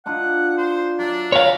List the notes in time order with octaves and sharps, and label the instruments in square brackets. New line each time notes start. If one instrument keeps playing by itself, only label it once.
[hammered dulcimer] D4 D#4 F4 [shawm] F#5
[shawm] C5
[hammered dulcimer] F#3 E5 [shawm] D4
[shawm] A#4 [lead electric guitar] C#5 F5